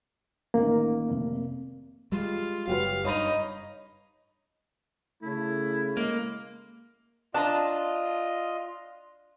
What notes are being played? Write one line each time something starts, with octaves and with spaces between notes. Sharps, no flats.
A1 D#3 A#3
F1
G3 G#3 F4
F#1 F#3 G4 B4 F5
G2 D#4 C#5 D#5 B5 F7
C#3 A3 E4
G#3 A#3
D4 F4 D#5 A5 A#5